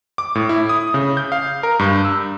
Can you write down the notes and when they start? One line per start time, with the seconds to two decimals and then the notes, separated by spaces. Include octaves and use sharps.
0.18 D6
0.35 A2
0.49 E4
0.69 D#6
0.94 C#3
1.17 G6
1.32 F5
1.63 A#4
1.79 G2
2.04 E6